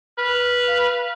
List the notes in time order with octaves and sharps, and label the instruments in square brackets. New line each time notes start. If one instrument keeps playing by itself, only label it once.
[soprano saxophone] B4 [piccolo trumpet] F6
[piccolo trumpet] F5